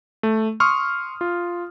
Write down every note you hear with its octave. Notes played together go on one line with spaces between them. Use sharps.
A3
C6 C#6 D#6 F6
F4